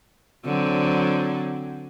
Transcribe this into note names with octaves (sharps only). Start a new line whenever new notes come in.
D3 F#3 C4